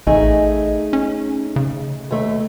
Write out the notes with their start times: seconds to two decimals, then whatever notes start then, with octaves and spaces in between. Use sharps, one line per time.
0.07 A1 A3 D#4 G#4
0.93 C#4
1.56 C#3
2.11 D#2 A3